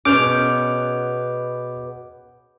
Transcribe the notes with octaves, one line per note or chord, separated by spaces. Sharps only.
B2 B3 C#4 G#4 D6 F6 G6 F7